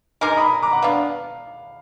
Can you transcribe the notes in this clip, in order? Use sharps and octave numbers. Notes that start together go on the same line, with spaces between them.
G#3 D#4 A#4 A#5 D6
B5 D#6
A#5 D6
F#5
B3 D4 F5